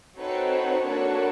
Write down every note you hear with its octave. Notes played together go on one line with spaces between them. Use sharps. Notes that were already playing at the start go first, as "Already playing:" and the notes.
C4 D#4 F#4 A4 B4 C#5
B4 C#5
A#3 D4 F#4 A4 B4 C#5